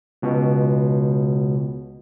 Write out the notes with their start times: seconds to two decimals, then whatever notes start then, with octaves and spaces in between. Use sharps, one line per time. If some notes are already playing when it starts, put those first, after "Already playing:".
0.22 C#2 B2